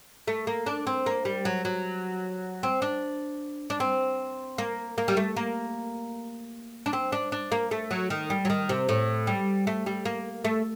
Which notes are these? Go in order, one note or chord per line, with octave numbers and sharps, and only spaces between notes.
A3
A#3
D4
C4
A#3
G3
F#3
F#3
C4
D4
D4
C4
A#3
A#3
G3
A3
A#3
D4
C4
D4
D4
A#3
A3
F#3
D#3
G3
F#3
D#3
C3
A2
G3
A3
G3
A#3
A3